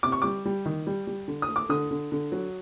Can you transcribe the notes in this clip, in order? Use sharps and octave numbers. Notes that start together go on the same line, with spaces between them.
C3 D6
C#6
G3 D6
G3
D#3
G3
G3
D3
D#6
A3
D6
D3 D#6
D3
D3
F#3